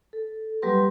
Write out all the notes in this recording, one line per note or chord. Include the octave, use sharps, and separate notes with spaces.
A4
F#3 G3 A#3 G4 B4 C6